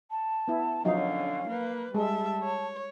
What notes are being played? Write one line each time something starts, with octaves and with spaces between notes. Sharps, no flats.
A5
B3 E4
D3 F3 F#3 C#4 D#4 F5
A#3 B4
G3 G#3 E5 A5
C#5